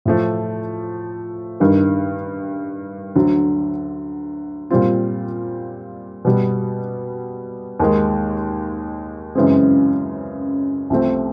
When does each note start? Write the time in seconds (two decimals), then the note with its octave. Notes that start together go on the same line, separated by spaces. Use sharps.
0.05 A2 F3 A3
1.60 G2 D#3 G3
3.16 D2 D3 F#3
4.71 A#2 G3 C4 F4
6.25 B2 G3 B3
7.80 D#2 D#3 G#3
9.35 F#2 C#3 E3 G#3 C4
10.90 C2 C3 F3 A3 C4